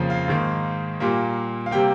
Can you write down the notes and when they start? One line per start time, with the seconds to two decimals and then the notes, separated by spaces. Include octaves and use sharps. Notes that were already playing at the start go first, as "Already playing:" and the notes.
Already playing: F2 C#3 F3 A#3
0.10 F5
0.28 G#2 D#3 A#3
1.00 A#2 G3 A#3
1.66 F5
1.71 C3 G3 A#3 G5